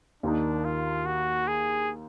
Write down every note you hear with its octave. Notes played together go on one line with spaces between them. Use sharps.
D#2 D#3 A#3 D4 D#4
F4
F#4
G#4